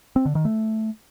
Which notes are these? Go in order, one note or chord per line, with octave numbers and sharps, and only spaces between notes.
C4
D3
D#3
A3